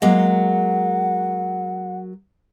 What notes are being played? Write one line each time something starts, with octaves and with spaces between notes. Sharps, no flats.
F#3 G#3 A#3 F#5